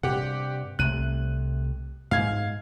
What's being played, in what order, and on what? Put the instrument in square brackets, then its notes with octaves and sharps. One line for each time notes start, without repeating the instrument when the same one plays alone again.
[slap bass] G2 C3 [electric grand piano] G4 F#5
[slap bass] C2 C3 A3 [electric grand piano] F#6 D#7
[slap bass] G#2 [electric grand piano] F5 G#6